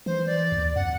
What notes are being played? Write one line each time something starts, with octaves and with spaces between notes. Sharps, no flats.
E3 C5
D5
D#2
F2 F#5